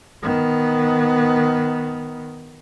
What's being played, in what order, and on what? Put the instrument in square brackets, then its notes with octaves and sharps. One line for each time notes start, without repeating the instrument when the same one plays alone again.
[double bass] D#3 B3